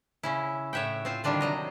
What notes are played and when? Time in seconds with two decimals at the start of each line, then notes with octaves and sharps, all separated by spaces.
0.23 C#3 C#4 E4
0.73 A2 C#5 E5 F#5 G5
1.05 C4 F4 C5
1.24 D3 D#3 G3 D4 F4 C5
1.41 C3 F#3 D#5 A#5